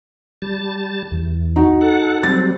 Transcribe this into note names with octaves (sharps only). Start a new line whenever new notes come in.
G3 A5
E2
D#4 F#4
A4 F#5
F#3 G3 C4 A6